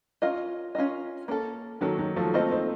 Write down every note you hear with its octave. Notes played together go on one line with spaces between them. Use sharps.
C#4 F4 A#4 D#5
C#4 F4 A#4 D#5
A#3 C#4 A4
D#3 F#3 A#3 C#4 A4
D#3 F#3
F3 A3
A3 A#3 C4 F4 C5 D#5
C4 D#4